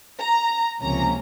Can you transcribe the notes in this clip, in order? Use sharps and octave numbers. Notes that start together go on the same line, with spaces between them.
A#5
C#2 C3 F3 A#3 C#4 A#5